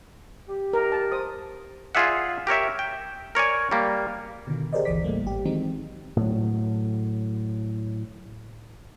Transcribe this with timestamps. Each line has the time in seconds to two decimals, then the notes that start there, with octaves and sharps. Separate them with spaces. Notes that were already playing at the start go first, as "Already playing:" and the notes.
0.48 G4
0.73 A#4
0.92 A5
1.12 C5 D#6
1.95 F4 G#4 D5 E5 F#5
2.47 G4 A#4 C#5 E5
2.79 G5
3.35 A#4 C#5 D5 G#5
3.71 G3 A#3
4.47 B2 D3 D#3
4.73 G4 G#4 A#4 C5 D5 D#5
4.85 G1 D2 E3 D5 D6 B6
5.04 A2 G3 A3 A#3
5.24 G#1 G4
5.45 D#3 E3 F#3 G#3 C4 D#4
6.16 A2 F#3